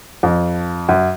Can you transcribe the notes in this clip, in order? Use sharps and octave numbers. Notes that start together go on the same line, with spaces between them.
F2
F#2